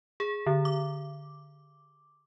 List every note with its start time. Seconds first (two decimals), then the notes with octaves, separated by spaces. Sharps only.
0.20 G#4
0.46 D3
0.65 D6